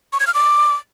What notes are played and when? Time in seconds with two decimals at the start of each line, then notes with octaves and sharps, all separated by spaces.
0.13 C#6
0.20 G#6
0.27 F6
0.34 D6